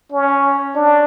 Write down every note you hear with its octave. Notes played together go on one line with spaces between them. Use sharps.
C#4
D4